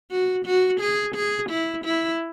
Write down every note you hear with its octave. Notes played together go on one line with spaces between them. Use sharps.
F#4
F#4
G#4
G#4
E4
E4